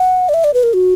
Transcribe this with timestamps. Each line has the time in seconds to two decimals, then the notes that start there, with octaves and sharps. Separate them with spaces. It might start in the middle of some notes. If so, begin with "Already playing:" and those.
Already playing: F#5
0.29 D5
0.34 E5
0.44 D5
0.54 B4
0.63 A#4
0.74 F#4